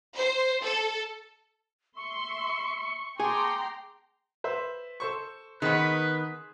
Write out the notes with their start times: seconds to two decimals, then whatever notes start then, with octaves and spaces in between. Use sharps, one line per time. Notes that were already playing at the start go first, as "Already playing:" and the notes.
0.16 C5
0.64 A4
1.97 E5 C6 C#6
3.20 G#4 G5 A5 A#5 C6 D6
4.44 B4 C5 E5
5.00 A4 C5 C#6
5.62 D#3 B3 G#4 B4 C5